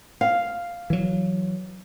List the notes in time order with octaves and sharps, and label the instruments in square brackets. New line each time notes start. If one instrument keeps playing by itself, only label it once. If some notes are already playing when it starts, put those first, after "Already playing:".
[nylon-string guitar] F5
[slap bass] E3 F#3